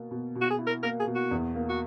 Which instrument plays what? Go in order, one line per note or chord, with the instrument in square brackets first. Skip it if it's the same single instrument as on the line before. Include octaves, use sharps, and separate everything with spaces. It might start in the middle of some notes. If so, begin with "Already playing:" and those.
Already playing: [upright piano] B2 A#3
B2
B2
[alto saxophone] F#4
G#4
[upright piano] E4
[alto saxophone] A#4
[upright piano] A#3 [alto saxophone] A#4
[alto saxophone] G#4
[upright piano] B2
[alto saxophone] F#4
[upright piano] E2
A#3
[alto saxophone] F#4